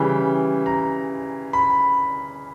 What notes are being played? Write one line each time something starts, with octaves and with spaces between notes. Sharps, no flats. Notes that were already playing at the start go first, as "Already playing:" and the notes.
Already playing: C#3 E3 G3 G5
A#5
B5